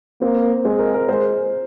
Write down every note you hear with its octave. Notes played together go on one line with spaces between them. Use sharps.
A#3 C4
G#3 C4
A#4
A#4
G#3 C5